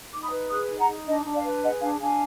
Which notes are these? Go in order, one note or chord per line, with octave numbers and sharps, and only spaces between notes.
D#4 D6
B5 D#6
B4
G#4 D#6 F#6
D#4
F#5 A#5
D#4
D4 D#5
D4
D5 F5
B4
G#4 D#5 F#5
D4 F5 G#5
D4 F5 G#5